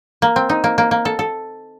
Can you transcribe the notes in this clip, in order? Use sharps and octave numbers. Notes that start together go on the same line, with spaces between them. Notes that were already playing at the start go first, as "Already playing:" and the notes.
A#3
C4
D#4
A#3
A#3
A#3
A4
A4